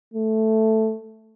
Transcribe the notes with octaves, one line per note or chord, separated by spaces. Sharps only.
A3